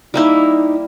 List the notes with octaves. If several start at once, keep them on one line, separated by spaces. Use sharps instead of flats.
G3 A#3 D#4 E4